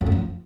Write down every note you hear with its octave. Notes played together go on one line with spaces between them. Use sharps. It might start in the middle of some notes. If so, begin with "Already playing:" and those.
F2
F#2
F3